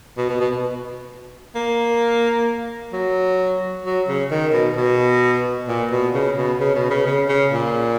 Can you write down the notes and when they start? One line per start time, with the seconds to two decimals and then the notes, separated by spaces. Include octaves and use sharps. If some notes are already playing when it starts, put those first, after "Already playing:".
0.18 B2
0.29 B2
0.40 B2
1.55 A#3
2.93 F#3
3.85 F#3
4.08 C#3
4.31 D#3
4.53 B2
4.77 B2
5.68 A#2
5.92 B2
6.14 C#3
6.37 B2
6.60 C#3
6.75 B2
6.91 C#3
7.06 C#3
7.29 C#3
7.52 A#2